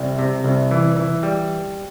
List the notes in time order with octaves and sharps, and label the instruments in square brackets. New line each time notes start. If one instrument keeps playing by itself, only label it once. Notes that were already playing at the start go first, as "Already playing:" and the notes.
Already playing: [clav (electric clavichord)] C2 G3
C3
C2
E3
E3
G3